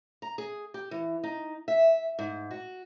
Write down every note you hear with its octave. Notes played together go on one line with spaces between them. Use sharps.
A#5
G#4
G4
E3
D#4
E5
G#2
F#4